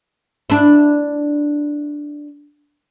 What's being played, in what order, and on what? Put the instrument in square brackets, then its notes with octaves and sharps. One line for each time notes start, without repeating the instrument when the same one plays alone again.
[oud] D4 E4